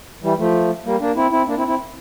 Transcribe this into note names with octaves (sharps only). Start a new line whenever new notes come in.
E3 G3
F3 A3
G3 A#3
A#3 D4
C4 E4
C4 E4
A#3 D4
C4 E4
C4 E4